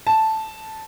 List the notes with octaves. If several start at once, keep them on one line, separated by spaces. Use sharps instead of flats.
A5